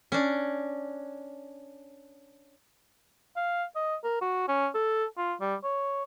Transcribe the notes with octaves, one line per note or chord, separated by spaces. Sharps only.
C#4 D4
F5
D#5
A#4
F#4
C#4
A4
F4
G3
C#5